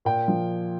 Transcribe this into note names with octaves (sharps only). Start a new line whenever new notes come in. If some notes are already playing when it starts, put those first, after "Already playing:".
A#2 G5
F3